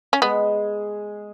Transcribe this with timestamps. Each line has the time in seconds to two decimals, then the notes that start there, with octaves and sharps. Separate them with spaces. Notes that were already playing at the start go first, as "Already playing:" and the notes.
0.13 C#4
0.22 G#3 B3